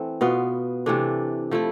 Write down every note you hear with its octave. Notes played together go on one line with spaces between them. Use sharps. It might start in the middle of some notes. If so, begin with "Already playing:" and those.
Already playing: E3 A3 C4
B2 B3 F4
C3 E3 A3 D4
F3 A3 E4